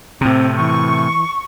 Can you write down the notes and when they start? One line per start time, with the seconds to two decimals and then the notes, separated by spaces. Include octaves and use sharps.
0.21 A2 C3 C4
0.57 E3 C#6